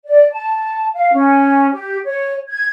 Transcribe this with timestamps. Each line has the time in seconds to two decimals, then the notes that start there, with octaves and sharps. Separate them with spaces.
0.07 D5
0.33 A5
0.94 F5
1.13 C#4
1.72 G4
2.05 C#5
2.49 G#6